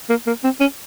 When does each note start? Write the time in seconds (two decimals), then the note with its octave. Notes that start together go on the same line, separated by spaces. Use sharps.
0.09 A#3
0.27 A#3
0.44 C4
0.60 C#4